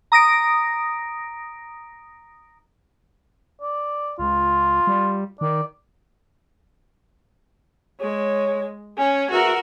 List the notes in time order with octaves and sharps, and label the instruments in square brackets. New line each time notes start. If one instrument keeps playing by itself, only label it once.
[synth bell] A#5 D#6 A#6 D7
[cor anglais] D5
[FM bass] C#2 [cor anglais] F4
[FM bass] G3
[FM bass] D#3 [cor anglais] D5
[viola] G#3 [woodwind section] C#5
[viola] C#4 [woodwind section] G#5
[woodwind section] E2 E5 [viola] F#4 A#4